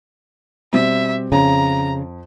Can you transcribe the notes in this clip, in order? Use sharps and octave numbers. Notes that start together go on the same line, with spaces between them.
B2 G3 C4 E5
F2 C#3 A#5